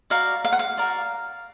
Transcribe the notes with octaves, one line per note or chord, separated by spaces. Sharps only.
F#4 A#4 D5 F5
F5
F#5
F5
F#4 A#4 D5